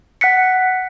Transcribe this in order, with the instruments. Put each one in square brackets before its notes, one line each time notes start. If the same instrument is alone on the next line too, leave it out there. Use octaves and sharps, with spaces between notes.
[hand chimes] F#5 F#6 B6 C#7